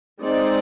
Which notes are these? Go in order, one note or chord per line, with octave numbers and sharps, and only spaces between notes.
G#3 C4 D#4 G#4 D5